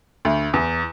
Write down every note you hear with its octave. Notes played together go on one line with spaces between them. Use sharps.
D2
E2